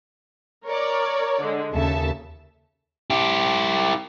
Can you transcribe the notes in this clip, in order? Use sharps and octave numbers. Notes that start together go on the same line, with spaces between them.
A#4 C#5 D5
D3 G#3
D#2 C#3 A4 E5 A5
E4 G4